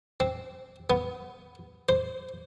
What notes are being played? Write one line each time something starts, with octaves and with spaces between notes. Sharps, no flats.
C4
B3
C5